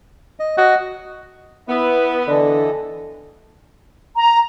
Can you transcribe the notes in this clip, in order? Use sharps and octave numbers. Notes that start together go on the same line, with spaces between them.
D#5
F#4 D#5
B3 E4 E5
D3 E3 A4 D#5
A#5